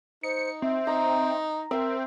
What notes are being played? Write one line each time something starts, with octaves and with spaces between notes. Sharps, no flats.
D#4 C5 C#7
C4 E5
D#4 A#5
C4 A#4 E5 G5